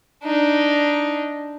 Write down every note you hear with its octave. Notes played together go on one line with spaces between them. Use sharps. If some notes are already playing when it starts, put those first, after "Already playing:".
D4 D#4